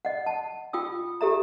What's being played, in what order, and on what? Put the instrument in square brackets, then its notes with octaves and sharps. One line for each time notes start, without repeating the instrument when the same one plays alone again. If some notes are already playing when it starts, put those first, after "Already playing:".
[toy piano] D#5 F#5
A5
F4 G5 D#6 E6
G4 A4 E5 A#5